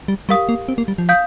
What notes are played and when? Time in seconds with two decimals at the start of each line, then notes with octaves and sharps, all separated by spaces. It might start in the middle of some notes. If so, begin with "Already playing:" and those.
0.08 G3
0.29 G3 G4 A#4 F5 D#6
0.49 A#3
0.68 C4
0.78 A#3
0.88 G3
0.98 F3
1.09 F5 D#6 G6